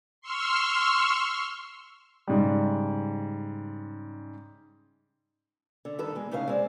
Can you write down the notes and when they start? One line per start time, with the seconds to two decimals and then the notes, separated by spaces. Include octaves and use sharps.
0.21 C6 C#6 E6 F6
2.27 G#2 C#3 G3
5.85 D3
5.99 G2 D#3 A4 B4
6.15 E2 G#3
6.31 A2 C#3 D#4 B4 E5 F5
6.48 G#3 C4 D5